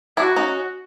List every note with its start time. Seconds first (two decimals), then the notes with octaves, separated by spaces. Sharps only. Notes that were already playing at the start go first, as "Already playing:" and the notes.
0.17 D4 E4 F#4
0.36 C#4 D#4